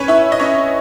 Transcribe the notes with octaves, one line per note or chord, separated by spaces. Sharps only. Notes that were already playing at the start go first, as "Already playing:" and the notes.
Already playing: C#4 B4 C#5
E4 E5
D#5
C#4 C#5